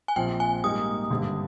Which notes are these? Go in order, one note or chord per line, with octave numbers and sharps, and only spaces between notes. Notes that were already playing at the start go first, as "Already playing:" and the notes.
G#5
A#1 A#2 F3 C4 F4 G5
G#5
G#2 G3 A#3 D#4 D#6
G#1 G2 D3